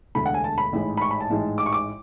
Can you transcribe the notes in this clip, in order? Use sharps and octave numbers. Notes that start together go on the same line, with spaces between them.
E1 D2 D3 B5
F#5
G#5
A5
B5
A1 G#2 G#3
B5
C#6
B5
A5
A1 G#2 G#3
D6
C#6
D6